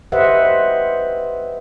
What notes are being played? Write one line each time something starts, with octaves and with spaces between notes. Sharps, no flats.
G4 B4 C5 D#5 E5 F#5